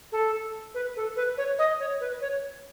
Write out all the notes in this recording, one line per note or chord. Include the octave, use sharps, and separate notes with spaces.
A4
B4
A4
B4
C#5
D#5
C#5
B4
C#5